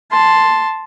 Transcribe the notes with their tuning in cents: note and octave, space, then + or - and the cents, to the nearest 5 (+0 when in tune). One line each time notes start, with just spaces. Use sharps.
A5 +0 C6 +0